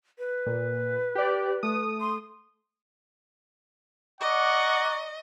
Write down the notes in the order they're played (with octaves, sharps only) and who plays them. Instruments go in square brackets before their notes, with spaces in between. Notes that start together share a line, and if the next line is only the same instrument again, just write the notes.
[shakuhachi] B4
[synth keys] A#2
G4 D5
A3 D#6
[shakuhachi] C6
[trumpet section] D5 A#5 C#6 [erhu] D#5 [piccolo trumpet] F#5 [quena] D6